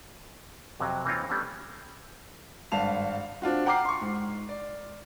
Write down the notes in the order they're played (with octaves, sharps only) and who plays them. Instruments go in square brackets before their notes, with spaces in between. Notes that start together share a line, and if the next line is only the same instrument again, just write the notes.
[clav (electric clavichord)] F2 C3 F#3
E3 A#3 C4 D#4 F4 C#5
G3 A3 B3 C#4 D4
[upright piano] G#1 G2 F5 A5 F7
C4 D4 F4 F#4
F#5 G5 A#5 D6 F6 C7
C6 C#6
G#2
D5